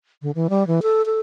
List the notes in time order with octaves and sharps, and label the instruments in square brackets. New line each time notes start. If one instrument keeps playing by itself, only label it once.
[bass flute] D3
E3
G3
E3
A4
A4